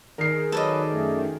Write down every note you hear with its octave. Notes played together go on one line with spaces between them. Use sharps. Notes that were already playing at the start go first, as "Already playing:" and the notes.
D#3 G#4 A#4 C7
F#3 A4 B4 D5 D#5
F#2 A3